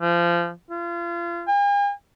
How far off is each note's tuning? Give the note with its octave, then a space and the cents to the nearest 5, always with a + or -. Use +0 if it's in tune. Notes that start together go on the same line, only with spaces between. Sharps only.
F3 -25
F4 -30
G#5 -45